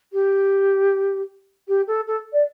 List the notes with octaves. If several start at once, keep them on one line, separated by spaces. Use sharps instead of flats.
G4
G4
A4
A4
D5